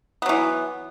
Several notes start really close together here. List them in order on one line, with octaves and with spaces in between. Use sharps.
B3 F#3 E3